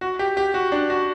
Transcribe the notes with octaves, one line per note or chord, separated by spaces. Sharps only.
F#4
G4
G4
F#4
D4
F#4